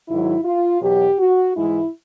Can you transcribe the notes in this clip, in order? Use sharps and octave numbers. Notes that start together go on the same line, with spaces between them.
G#2 D#3 F#3 E4
F4
E2 B2 F#3 G4
F#4
G#2 E3 G#3 E4